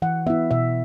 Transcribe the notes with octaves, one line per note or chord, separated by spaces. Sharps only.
E3 F#5
B3 E4 E5
B2 E5